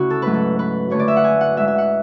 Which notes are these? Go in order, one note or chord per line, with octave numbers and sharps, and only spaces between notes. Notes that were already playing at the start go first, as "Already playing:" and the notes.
Already playing: D2 C#3 E4 F#4
A4
G#2 F#3 A3 B4
A4
B4
F#2 D3 A3 C#5
D5
E5
F#5
G#5
F#5
G#2 G#3 E5
E5
F#5